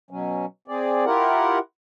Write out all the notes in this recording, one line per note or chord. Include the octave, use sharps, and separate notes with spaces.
B2 F#3 C#4
C4 G#4 D5
E4 F4 G4 A#4 F#5